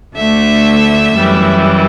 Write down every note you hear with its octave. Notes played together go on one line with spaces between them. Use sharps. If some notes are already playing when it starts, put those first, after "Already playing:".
D2 D3 A3 E5
F#2 E3 G3